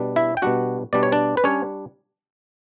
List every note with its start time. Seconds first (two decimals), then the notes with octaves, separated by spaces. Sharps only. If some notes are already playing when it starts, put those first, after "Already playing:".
Already playing: B2 G3 D4
0.16 E4 E5
0.37 G5
0.42 B2 G3 D4 F#4 F#5
0.93 B2 G3 D4 D5
1.03 C#5
1.12 D4 D5
1.37 B4
1.44 G3 C#4 D4 C#5